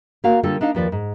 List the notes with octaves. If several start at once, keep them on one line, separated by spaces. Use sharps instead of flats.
A#3 F#4 F5
D3 G3 F4 A4
D4 D#4 D#5 F5
D#2 F3 B4 D5
G#2